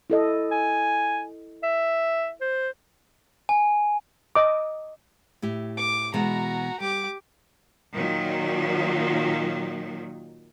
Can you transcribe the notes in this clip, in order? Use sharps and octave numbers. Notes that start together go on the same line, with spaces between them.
E4 A4 D#5
G#5
E5
C5
G#5
D#5 D6
A2 E4 G4
D6
B2 E3 G#3 F#4 A#5
G3 G4 D6
A#2 D#3 F#3